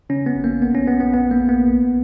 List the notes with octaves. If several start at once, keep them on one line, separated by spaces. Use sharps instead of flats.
C#3 C#4
B3
G#1
A#3
A#1 B3
C#4
A#1 B3
B3
A#1 B3
A#3
A#1
B3
B1